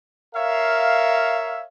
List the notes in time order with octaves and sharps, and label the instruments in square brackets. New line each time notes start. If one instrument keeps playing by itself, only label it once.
[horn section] A#4 C#5 E5 F5